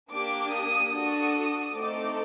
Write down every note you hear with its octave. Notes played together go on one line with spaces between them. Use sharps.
A#3 D4 G4 D6
D#6
D4 F#4 A4 D#6
A3 C4 D#4 A4 D6